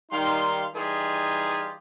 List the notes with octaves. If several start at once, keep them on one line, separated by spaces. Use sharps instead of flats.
D#3 G3 D#4 F5 C6
E3 G3 D#4 F4 G4 G#4